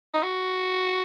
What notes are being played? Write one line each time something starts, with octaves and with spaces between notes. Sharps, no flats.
D#4
F#4